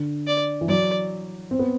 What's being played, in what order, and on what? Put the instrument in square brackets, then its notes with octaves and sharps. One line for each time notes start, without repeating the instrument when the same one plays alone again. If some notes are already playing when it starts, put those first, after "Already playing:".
Already playing: [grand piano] D3
[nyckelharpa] D5
[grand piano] E3
[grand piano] F#3 [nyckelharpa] D5
[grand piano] C4
B3